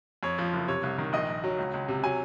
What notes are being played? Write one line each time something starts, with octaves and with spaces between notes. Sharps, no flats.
F2 C#5
F3
F#1
C3 C#5
C2
D#3
A#1 D#5
A#1
F#3
C#2
C#2
C3
F#3 G#5